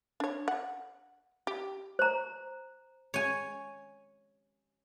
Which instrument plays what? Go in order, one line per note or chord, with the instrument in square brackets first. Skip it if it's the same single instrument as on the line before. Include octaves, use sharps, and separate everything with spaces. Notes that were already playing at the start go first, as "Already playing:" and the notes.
[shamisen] D4 C#5
F#5
G4
[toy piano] C5 A#5
[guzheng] C#5 G#5